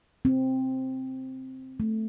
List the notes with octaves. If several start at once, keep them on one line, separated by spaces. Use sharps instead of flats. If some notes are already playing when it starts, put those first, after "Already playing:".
C4
A3